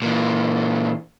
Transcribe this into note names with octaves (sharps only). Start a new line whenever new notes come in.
A#2 E3